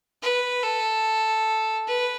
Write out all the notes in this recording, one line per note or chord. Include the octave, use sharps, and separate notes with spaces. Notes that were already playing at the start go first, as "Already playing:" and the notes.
B4
A4
B4